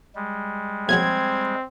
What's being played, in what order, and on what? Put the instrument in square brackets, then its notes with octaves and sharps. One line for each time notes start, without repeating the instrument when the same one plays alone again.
[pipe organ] G3 G#3
[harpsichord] A#1 F#3 G#4 [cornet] C4 [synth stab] G#6